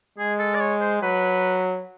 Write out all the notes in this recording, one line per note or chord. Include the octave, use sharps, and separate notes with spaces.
G#3 G#4
A4
D5
C#5
C5
F#3 B4